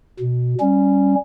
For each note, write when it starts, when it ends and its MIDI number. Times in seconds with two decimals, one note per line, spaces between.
0.20 0.55 47
0.60 1.15 55
0.60 1.15 61